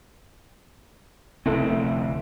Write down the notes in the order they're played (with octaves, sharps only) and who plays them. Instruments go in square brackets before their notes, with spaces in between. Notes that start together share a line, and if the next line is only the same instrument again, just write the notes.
[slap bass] F1 D2 C4 [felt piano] E4 A4